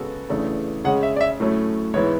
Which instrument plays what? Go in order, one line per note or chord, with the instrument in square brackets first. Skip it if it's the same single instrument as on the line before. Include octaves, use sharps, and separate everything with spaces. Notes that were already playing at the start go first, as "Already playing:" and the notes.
Already playing: [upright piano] C#3 G#3 B3 F#4 A4
E2 C#3 E3 A3 D4
[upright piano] C#3 G#3 C#4 [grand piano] F#5
[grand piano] E5
D5
E5
[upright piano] A2 F#3 A3 C#4
[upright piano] G#2 E3 B3 E4 [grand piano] C#5